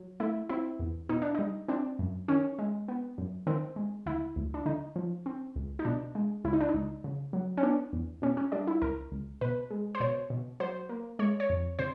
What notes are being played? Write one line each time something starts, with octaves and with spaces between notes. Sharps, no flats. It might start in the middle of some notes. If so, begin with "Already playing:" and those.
Already playing: F#3
A3 E4
C4 E4
E2
B2 D#4
D4
G3 D#4
C4 D4
F#2
D#3 C#4
G#3
B3
F#2
D#3 C4
G#3
D2 E4
D2
D4
D3 D#4
F3
C4
C#2
D#4
B2 D4
G#3
C#2 E4
D#4
D4
D#4
C#2
C#3
F#3
C#4
B3 D4
E2
B2 C#4
C#4
G3 D4
E4
C#2 A#4
C#2
B2 B4
G#3
C5
B2 C#5
B2
F#3 C5
A#3
G#3 C#5
C#5
F2
C3 C5